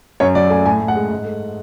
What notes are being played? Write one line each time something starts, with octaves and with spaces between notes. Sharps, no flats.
F#2 C#5
F#3 D5
A3 G#5
A2 G#5
A2
F#5
G#3
G#2
A3